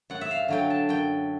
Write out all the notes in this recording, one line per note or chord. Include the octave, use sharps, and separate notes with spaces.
F#2 F#5
E5
F5
D3 F#3 G5
A5
F#2 G5